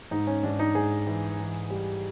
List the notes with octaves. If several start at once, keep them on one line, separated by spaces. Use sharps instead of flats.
G#2 D#4
C#4
G#2 D4
D#4
G#2 G#4
E3
E3
G3